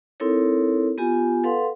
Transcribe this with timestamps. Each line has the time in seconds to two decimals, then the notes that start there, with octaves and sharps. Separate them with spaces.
0.20 C4 D#4 E4 A4 A#4 C#5
0.98 B3 F4 G4 G#5
1.44 A4 B4 F5 F#5 C6